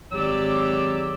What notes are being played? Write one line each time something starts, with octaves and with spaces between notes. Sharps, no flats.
G#1 F#3 G4 D5 E6